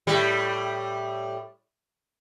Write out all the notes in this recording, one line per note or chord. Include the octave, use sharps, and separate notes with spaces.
A2 G3